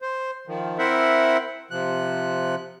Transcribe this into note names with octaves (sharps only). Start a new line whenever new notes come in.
C5
D#3 F3
C4 E4 A#4 C5 E5 F#5
C3 F3 F#6